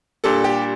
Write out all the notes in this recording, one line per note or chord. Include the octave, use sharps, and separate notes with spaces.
A#2 G3 D4 A4
G4